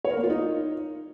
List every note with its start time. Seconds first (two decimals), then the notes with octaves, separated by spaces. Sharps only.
0.05 C#5
0.11 A#4
0.17 A#3
0.23 F4
0.30 D#4